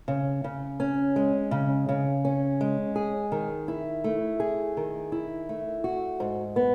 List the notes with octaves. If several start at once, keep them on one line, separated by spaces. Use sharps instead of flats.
C#3
C#3
C#4
G#3
C#3
C#3
C#4
G#3
G#4
D#3
E4
A3
G#4
D#3
E4
A3
F#4
G#2
B3